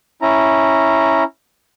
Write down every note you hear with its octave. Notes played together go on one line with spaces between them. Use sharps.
C#4 E4 A#5